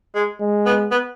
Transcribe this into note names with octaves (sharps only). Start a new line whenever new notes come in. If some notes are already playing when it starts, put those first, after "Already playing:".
G#3
G#3
B3
B3